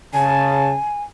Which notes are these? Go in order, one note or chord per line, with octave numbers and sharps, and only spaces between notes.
C#3 G#5 A5